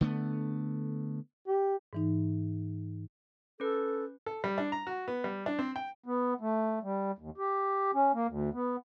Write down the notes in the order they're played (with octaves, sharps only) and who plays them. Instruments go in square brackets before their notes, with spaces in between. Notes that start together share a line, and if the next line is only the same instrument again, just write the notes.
[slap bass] D3 A3 B3
[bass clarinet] G4
[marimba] G#2 E3 D#4
[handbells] C#4 B4 [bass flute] A4
[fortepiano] A4
G3
D4
A#5
F#4
B3
G3
D4
C4
G5
[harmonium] B3
A3
G3
D#2
G4
C#4
A#3
D2
B3